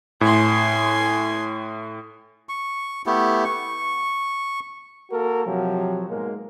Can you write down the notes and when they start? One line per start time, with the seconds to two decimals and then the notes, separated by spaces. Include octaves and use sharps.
0.21 A2 G#5 C6
2.49 C#6
3.06 A3 B3 E4 G4
3.44 C#6
5.11 A#3 F#4 A4 A#4
5.47 C3 F3 F#3
6.09 G#2 B2 G#3 A#3 A#4